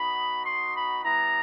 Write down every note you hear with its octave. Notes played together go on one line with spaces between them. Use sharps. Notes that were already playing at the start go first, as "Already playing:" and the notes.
Already playing: B3 D#4 F#4 B5
C6
B5
G3 B3 E4 A#5